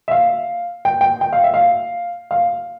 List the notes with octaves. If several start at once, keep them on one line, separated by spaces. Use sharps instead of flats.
E5
F5
G5
G5
G5
F5
E5
F5
F5